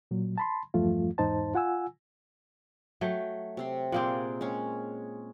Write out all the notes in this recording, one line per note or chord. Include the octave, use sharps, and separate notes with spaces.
A#2 F#3
A5 B5 C6
E2 G2 F3 A3 F4
E2 G#2 D#4 C5 A5
F4 F#5 G#5 E6
F#3 A3 G5
C3 C4 C6
A#2 A#3 C4 G#4 D5 F#5
G#3 C#4